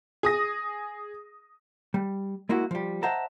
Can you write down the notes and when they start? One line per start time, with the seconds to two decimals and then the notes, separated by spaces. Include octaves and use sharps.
0.23 G#4 D#6 A#6
1.94 G3
2.49 G#3 A#3 E4 F#4
2.71 F3 G3
3.03 C5 D#5 E5 F#5 A5 A#5